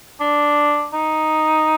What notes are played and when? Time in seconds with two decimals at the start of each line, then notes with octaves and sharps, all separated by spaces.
0.20 D4
0.93 D#4